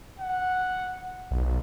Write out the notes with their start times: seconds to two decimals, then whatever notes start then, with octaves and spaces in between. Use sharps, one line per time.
0.20 F#5
1.31 B1